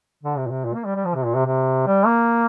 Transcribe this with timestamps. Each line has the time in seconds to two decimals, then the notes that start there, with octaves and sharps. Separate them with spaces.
0.23 D3
0.38 C3
0.47 A#2
0.51 C3
0.65 A#2
0.75 A#3
0.85 G3
0.96 G3
1.05 F3
1.15 C3
1.26 A#2
1.35 C3
1.46 C3
1.87 G3
2.06 A#3